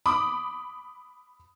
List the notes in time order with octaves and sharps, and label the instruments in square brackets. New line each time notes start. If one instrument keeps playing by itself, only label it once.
[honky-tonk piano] B5 D6 D#6